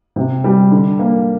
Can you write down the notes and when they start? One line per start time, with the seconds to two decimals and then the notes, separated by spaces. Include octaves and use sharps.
0.16 C3
0.44 G3
0.71 D3
0.99 A#3